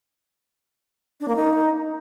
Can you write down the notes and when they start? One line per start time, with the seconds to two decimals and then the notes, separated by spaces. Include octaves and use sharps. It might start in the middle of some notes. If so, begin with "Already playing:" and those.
1.20 D4
1.28 A#3
1.36 D#4